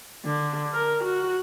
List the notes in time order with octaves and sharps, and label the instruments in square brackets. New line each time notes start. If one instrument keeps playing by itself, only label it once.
[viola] D3
A#4
F#4